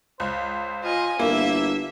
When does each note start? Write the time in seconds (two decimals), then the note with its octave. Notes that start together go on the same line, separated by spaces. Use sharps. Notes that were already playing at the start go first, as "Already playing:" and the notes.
0.20 C#2 C5
0.84 F4 D#5 G#5
1.20 G1 A#3 E4 E5